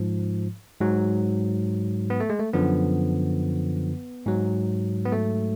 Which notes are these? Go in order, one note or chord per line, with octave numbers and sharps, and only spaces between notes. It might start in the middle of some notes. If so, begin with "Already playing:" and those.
Already playing: G#2 F3
G#2 F#3
B3
A3
G#3
A3
F#2 D3 F3 B3
G#2 F#3
B3
A3